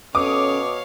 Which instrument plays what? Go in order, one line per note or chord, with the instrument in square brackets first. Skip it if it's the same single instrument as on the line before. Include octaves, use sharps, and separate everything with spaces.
[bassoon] B2 [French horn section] C#4 A4 [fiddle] C#5 F5 [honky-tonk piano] D6 D#6